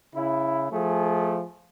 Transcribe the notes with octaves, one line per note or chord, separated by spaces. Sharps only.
C#3 E4
F3 A3 G#4